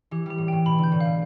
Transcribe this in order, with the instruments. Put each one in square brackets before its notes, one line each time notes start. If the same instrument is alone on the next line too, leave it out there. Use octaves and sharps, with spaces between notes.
[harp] E3 [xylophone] G4
[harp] G3 [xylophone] G4
[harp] A2
[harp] A2 [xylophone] G5
[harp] B2 [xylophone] B5
[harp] D3
[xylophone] G6
[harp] A2
[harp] B2 [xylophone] F5